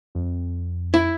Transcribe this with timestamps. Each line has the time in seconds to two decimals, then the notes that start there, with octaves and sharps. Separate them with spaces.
0.15 F2
0.94 E4